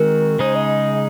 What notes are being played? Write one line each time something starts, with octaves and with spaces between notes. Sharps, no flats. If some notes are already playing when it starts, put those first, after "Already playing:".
Already playing: D#3 G#3 C4 F#4 A#4
C#3 G#3 D#4 G#4 C5
D#5